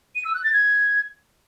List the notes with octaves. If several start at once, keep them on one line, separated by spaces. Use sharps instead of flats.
D#7
E6
F#6
A6
G#6